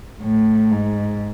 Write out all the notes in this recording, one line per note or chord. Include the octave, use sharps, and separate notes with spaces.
A2
G#2